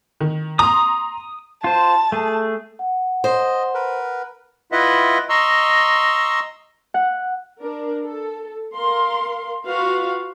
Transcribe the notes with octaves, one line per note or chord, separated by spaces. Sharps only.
D#3
A#5 C6 D#6
F4 C5 A5
A3 G#4
F#5
C5 D#5
A#4 B4
E4 F4 B4 D#5 E5 F#5
D#5 A#5 C6 C#6 E6
F#5
D4 A#4
A4
A#4 F5 C6
F4 F#4 B4 F5